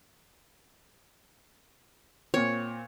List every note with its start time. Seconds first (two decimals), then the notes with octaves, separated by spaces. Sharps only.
2.34 A#2 C4 C#5